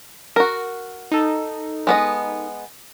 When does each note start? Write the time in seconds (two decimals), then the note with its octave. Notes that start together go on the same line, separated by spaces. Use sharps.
0.36 F#4 A#4
1.12 D#4 A4
1.87 G#3 B3 D#5